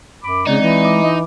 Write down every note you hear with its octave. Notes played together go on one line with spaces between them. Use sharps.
F#2 B5 D6
C#3 G#3 C4 D#4 D5
E3
D6
D#5